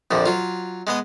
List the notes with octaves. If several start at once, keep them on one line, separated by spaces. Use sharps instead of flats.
A#1 F2 D3
F#3 F4
G#3 B3 D#5